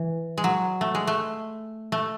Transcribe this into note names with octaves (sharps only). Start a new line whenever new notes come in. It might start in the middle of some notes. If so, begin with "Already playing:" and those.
Already playing: E3
G#3
F#3
A3
G#3
A3
A3